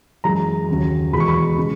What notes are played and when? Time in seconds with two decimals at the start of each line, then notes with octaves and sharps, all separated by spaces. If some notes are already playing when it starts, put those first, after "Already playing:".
0.24 F#2 E3 G#3 A#5
0.69 D#2 C#3 F#3
1.13 E2 B2 G#3 B5
1.20 C#6
1.28 B5
1.58 C#3 G#3